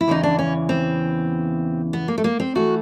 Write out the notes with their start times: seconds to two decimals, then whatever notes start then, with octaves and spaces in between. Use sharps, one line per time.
0.01 E4
0.08 E2 C#3 E3 D#4
0.23 D4
0.39 C#4
0.69 C4
1.93 B3
2.08 A#3
2.18 A3
2.24 A#3
2.40 C4
2.55 E3 A3 F#4